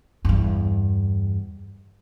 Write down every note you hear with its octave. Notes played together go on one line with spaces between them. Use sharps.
E2 G2